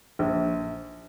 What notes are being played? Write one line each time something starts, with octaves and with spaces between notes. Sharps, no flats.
A#1